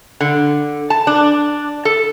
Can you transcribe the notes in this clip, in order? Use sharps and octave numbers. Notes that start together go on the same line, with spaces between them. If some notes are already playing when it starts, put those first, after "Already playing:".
D3
A5
D4
A4